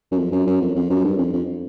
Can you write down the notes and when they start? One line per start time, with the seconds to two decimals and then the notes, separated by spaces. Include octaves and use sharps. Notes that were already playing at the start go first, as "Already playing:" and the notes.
0.11 F#2
0.17 F2
0.32 F#2
0.47 F#2
0.61 F2
0.75 F2
0.90 F#2
1.05 G2
1.18 F2
1.33 F2